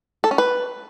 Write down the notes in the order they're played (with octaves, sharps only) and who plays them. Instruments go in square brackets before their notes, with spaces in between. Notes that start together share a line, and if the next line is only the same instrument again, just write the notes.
[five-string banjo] A4
C#4
B4